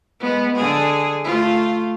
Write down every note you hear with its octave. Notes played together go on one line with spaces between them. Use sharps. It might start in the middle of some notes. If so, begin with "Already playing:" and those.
G#3 B3
D3 G#4
A3 F4